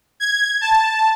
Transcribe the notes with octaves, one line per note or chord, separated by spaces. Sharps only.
G#6
A5